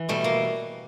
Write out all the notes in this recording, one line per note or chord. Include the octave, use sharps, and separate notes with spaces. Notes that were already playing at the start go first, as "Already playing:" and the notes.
Already playing: E3
B2 G3 A3
A#3